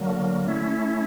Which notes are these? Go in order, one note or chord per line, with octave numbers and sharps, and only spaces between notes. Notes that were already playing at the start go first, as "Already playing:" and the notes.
Already playing: D3 F#3 A#3
A3 C#4 E4